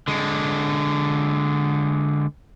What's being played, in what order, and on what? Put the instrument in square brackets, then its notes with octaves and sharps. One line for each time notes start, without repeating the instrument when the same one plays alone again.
[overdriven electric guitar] D3 G#3